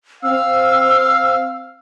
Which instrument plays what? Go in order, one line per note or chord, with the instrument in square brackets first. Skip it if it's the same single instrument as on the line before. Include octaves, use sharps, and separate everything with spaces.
[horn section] C4 F5 [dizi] E6